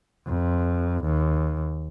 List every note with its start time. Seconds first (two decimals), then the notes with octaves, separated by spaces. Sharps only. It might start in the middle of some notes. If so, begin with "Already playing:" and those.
0.27 F2
1.05 D#2